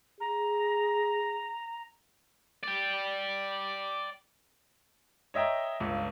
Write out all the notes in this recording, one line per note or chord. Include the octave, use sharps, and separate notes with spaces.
G#4 A#5
D5 G5
C#5 D#5 E5 G5 A#5
G1 C#2